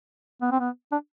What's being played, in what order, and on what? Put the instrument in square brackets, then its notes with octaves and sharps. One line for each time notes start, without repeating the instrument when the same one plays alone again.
[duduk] B3
C4
B3
D4